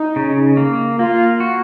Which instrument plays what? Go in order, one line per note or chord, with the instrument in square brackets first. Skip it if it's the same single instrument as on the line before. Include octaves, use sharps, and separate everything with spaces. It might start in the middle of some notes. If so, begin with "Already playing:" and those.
Already playing: [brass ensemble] D#4
[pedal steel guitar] C#3
A#3
[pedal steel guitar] A#3 [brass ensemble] F4
[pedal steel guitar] F#4